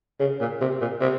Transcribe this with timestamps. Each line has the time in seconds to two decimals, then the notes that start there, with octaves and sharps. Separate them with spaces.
0.20 C#3
0.40 A#2
0.61 C3
0.81 A#2
1.01 C3